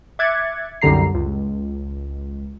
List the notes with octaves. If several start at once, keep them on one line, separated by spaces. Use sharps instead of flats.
E5 D6 F#6 G#6 A6 C#7
C2 F#2 D3 G4 A#5 C7
C#2